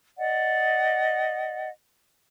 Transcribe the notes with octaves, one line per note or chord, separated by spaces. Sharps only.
D5 D#5 F#5